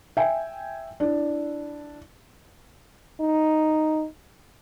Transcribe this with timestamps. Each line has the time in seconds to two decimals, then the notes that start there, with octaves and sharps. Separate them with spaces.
0.17 E5 G5 G#5
1.00 D4 E4
3.20 D#4